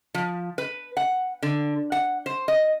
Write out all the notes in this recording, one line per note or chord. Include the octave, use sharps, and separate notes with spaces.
F3
B4
F#5
D3
F#5
C5
D#5